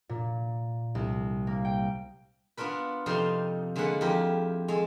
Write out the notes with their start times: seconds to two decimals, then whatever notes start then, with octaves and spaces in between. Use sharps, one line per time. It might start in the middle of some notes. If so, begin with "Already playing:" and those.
0.09 A#2
0.95 C2
1.47 A#3
1.65 G5
2.57 B3 D4 F4 A#4 B4
3.06 F2 C3 D#4 D5 F5 C6
3.76 D3 G#3 A#3 F4 F#5 B5
4.01 F2 E4 G4 A#4
4.68 G#3 A4